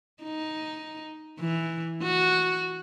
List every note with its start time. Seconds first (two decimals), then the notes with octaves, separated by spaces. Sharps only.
0.23 D#4
1.39 E3
2.02 F#4